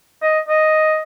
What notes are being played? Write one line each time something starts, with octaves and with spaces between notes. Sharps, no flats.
D#5
D#5